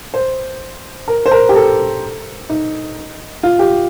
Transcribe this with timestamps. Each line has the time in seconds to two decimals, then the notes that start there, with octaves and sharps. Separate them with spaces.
0.14 C5
1.08 A#4
1.26 C5
1.31 A#4
1.49 G4
1.56 A4
2.49 D#4
3.43 F4
3.59 G4